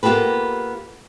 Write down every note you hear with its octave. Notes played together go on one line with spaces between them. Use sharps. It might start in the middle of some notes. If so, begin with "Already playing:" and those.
A#3 B3 F4 G4 A4 B4